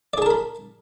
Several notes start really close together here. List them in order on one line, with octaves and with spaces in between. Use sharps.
D5 G#4 A5 A#4 B5